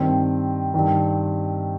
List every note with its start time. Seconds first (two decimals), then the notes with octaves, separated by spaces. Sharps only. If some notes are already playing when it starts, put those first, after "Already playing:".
Already playing: G2 D#3 C4
0.74 G2 D#3